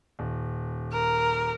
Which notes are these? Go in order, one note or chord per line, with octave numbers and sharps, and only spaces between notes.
D#1
A#4